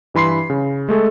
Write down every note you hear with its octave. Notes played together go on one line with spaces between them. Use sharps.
G2 E3 B5 C6 C7
C#3
G#3 A3 G#4 A4